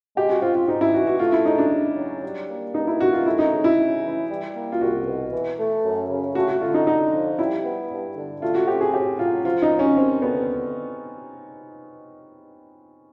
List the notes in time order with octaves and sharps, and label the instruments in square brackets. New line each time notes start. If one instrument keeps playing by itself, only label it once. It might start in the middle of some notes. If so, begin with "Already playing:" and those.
[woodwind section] G#3 [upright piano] G4
[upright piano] F#4
[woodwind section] C4 [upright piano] F4
[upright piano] F4
[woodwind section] G#2 [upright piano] D#4
[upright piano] E4
[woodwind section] E3 [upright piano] F#4
[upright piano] F#4
[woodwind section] A3 [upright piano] F4
[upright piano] E4
[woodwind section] C#3 [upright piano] D#4
[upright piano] D4
[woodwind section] C#3
F#3
G3
A#3
[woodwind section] G2 [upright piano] D#4
[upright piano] E4
[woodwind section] D#3 [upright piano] F#4
[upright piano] F4
[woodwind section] A3 [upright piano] E4
[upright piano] D#4
[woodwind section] C#3
[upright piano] E4
[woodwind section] C#3
E3
G3
A#3
[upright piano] F4
[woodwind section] C2 [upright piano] F#4
[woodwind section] B2
E3
A3
F#2
C#3
[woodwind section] A3 [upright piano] F#4
[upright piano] F#4
[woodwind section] D3 [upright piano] F4
[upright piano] D#4
[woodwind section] D3 [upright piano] D#4
[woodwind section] F3
[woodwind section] G3 [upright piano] E4
[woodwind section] B3
G2
D3
[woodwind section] A3 [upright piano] F4
[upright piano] F#4
[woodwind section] C4 [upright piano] G4
[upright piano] G#4
[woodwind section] A2 [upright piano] G4
[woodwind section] F#3 [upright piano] F4
[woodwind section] F3 [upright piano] F4
[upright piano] D#4
[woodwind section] D#2
[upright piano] C#4
[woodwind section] D#2 [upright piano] C4
[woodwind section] D3 [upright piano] B3